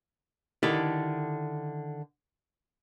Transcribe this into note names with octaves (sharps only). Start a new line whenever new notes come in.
D3 D#3 E4 G4 A4